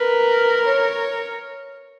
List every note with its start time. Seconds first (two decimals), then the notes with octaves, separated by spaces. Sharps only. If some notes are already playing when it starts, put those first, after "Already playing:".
Already playing: A#4 B4
0.65 C#5